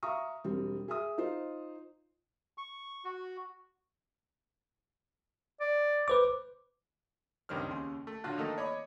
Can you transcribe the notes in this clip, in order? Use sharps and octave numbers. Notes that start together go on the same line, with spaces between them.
E5 F5 A#5 C#6 D#6
E1 G3 C4
G#4 E5 D#6
D#4 F4 C5
C#6
F#4
D5
B4 C5 D6
C#2 G2 D#3 C4 D#4 F6
D#2 C#3 C6
A3
A2 D3 F#3 F4 F5 F#6
D#3 A3 A#3 D#4 A4 A#4
C#5 D#5 B5 D6